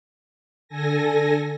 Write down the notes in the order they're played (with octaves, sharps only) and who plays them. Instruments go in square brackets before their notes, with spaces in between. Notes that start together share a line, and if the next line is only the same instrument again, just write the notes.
[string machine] D3 A4 G#5 A#6